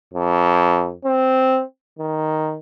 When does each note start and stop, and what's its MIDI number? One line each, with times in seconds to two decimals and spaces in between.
0.14 0.95 41
1.05 1.63 60
1.99 2.58 51